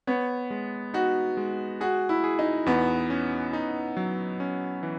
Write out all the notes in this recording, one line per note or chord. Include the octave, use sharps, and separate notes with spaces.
B3 C#5
G#3
D#4 F#4
G#3
F#4 G#4
E4
G#4
D#4
E2 B3
C#4
D#4
F#3
C#4
E3